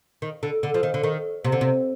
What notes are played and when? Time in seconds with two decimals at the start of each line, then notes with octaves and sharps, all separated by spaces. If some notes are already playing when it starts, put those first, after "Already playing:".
0.22 D#3
0.43 D3
0.63 D3
0.74 F3
0.83 D#3
0.94 D3
1.03 D#3
1.44 C3
1.52 D3
1.61 C3